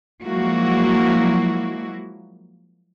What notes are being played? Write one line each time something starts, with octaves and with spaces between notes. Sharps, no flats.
F3 F#3 G#3 A#3 E4 F#4